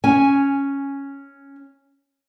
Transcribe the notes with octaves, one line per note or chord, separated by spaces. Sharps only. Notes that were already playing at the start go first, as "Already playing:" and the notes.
C#4 G#5